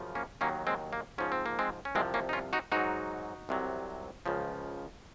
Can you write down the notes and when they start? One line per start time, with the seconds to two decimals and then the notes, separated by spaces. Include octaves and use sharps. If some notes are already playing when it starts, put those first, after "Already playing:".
Already playing: F#2 C#3 F3
0.15 A#3 C#4
0.41 D#2 D#3 F#3 A#3 C#4
0.67 G#3 C4
0.93 A#3
1.18 G#2 F3 C#4
1.32 C4
1.46 A#3
1.59 G#3 C4
1.85 C#4
1.95 C2 C3 F3 G#3 C4
2.14 A#3 C#4
2.29 D#4
2.33 C#4 F4
2.53 D#4 F#4
2.72 G#2 F#3 D#4 F#4
3.49 C2 C3 F#3
4.26 C#2 C#3 F3